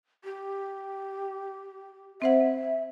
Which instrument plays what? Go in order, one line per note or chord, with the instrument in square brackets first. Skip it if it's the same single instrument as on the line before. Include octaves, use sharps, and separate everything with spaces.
[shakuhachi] G4
[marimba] C4 C5 F#5 [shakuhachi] E5